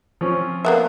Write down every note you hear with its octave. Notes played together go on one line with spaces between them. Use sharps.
F3 C4 C#4
A#3 B3 E5